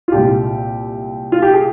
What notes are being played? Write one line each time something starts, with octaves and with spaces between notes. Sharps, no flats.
F4
C2 A#2 G#3 G4
F4
G4
G#4